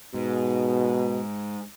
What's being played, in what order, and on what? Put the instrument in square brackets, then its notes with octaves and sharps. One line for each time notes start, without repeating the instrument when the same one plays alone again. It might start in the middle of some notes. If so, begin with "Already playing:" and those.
[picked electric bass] G#2 [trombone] B2